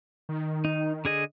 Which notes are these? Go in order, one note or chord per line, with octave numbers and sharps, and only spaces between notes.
D#3
D#4
D3 G#4 D#5